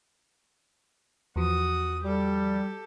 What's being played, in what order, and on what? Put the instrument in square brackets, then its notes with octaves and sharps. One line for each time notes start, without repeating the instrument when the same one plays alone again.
[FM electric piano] E2 F3 [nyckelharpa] F#4 D#6
[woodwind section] G3 [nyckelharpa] G4 A4